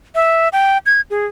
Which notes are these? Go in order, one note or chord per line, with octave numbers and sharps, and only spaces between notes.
E5
G5
G#6
G#4